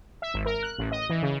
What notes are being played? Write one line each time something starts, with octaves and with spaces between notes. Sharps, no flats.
E5
G#1
A#4
F#6
A1
D#5
E3
C#3